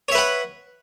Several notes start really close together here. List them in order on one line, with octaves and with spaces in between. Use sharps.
C#5 E5 B4 F#5